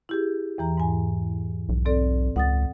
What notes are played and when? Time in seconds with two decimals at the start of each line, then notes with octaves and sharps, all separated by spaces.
0.09 E4 G4 G#4
0.58 E2 E3 A#5
0.77 G#2 G#5
1.69 B1
1.85 C4 A4 D5
2.36 C#2 F#5 D#6 A6